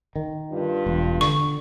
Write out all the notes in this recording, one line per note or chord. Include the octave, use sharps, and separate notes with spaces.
D#3
G2 F4
E1
D3 C#6